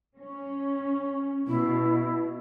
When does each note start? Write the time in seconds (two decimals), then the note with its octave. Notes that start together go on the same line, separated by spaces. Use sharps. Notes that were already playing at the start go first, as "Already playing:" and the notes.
0.17 C#4
1.47 B2 E4